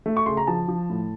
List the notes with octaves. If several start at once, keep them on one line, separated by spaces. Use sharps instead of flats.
A3
C#6
C#3 C6
A#5
F3 A5
F3
A2